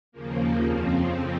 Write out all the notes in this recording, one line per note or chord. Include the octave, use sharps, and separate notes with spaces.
D#2 C#3 F3 A#3
F2 C#3 F3 C4